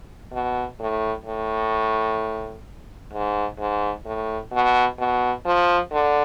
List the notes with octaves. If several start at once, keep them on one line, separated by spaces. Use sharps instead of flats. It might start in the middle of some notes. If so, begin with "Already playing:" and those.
B2
A2
A2
G#2
G#2
A2
B2
B2
F3
D3